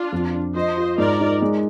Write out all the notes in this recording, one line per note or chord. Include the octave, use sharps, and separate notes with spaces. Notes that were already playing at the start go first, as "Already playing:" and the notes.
Already playing: D4 F4
F2
D4
F3 C5 D#5
F4
G#2 A#4 D5
D#4
G#3